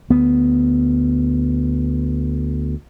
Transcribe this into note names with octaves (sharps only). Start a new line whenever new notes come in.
D2 B3